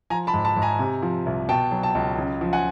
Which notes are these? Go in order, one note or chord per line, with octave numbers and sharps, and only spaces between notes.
F3 G#5 A#5
A5 B5
G#2
A5 B5
G#2
G#5 A#5
C3
F3
C2
B2 G5 A5
F#3
G5 A5
C#2
C#3
F3
F#5 G#5